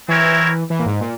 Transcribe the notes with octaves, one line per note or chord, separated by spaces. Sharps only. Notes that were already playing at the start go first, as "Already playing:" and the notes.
E3 C4 E4 A#4 C#5
E3
A#2
G#2
A#2